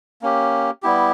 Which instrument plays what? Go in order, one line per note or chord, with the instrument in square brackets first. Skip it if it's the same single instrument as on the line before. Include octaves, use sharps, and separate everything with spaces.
[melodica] A#3 C#4 G4
G3 B3 E4 G4